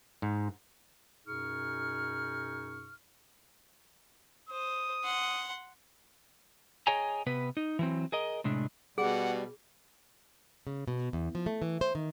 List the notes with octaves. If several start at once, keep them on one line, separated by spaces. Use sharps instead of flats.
G#2
F#2 B2 D#4 G#4 C#6 F6
C5 D#6
F#5 C6
G#4 C#5 D#5 G5 G#5 A#5
C3 B3 B4
D#4
E3 F#3 C4
G#4 A#4 D#5
A2 C3 G#3 D4
B2 G3 G#4 F#5
C#3
B2
E2
F3
A3
E3
C5
D#3